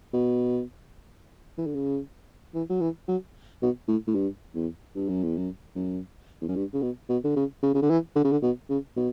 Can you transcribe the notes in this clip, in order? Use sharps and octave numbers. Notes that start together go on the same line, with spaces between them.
B2
E3
D3
C#3
E3
F#3
E3
F#3
B2
A2
A2
G2
E2
G2
F#2
E2
F#2
F#2
E2
F#2
G2
C#3
B2
B2
D3
C#3
C#3
C#3
D3
E3
D3
C#3
D3
B2
C#3
B2